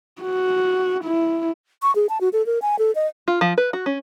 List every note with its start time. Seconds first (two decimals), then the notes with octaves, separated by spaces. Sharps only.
0.22 F#4
1.04 E4
1.82 C#6
1.95 G#4
2.09 A5
2.21 F#4
2.33 A4
2.46 A#4
2.62 G#5
2.79 A4
2.95 D#5
3.28 F4
3.41 F3
3.58 B4
3.73 F#4
3.86 C#4